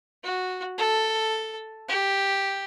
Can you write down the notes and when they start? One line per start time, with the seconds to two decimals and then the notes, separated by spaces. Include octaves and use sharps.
0.24 F#4
0.78 A4
1.88 G4